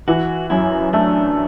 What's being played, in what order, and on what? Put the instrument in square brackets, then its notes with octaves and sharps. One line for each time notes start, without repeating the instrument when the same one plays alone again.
[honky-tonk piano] E3 [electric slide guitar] F#4
[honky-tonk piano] F#2 [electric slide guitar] E4
[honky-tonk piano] A3 [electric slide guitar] D4